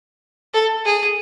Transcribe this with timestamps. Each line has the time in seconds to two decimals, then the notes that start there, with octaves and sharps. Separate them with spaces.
0.54 A4
0.85 G#4